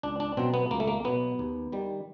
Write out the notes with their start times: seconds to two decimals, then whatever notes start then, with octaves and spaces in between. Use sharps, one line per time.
0.03 C#2 D4
0.20 D4
0.37 B2 F#3 C4
0.54 B3
0.71 C#2 A#3
0.80 A3
0.88 A#3
1.04 B2 F#3 B3
1.39 D#2
1.72 D#3 G3